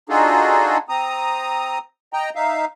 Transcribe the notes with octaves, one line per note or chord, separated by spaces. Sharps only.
D4 D#4 F4 F#4 G#4 A4
C4 A#5 D#6
D#5 G5 A#5
D#4 E5 F5